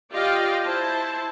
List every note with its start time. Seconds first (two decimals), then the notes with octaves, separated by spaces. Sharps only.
0.13 F4 G4 D5 D#5 F5 G5
0.64 E4 C5 A5